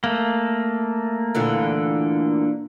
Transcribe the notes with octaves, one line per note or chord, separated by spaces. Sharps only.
A3 A#3
A#2 D3 E3